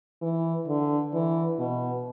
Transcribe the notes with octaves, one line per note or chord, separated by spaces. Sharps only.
E3
D3
E3
B2